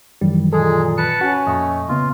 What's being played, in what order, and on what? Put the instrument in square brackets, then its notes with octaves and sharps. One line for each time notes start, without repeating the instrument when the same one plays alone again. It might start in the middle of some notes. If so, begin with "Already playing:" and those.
[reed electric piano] F#2 D#3 E3 [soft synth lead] G3
[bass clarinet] A#2 [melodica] G#3 G#4 [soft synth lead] A4
[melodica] B4 A5 [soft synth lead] C#7
[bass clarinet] C#4 [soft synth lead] F#4
[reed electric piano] F2 A#2 [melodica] A3 [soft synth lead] D#5
[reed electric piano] A#2 C#3 B3 [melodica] F4